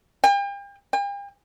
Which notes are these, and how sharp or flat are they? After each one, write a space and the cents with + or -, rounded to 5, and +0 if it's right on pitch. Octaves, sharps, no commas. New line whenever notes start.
G5 +40
G5 +45